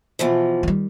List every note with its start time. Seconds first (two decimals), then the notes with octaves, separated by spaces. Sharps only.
0.19 B2 E3 F3
0.63 D#3 G3